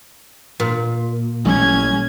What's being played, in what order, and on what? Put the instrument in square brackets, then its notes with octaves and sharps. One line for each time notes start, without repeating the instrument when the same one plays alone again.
[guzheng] A#2
[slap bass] A1 G3 A3 [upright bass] F#3 [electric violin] C#4 G#6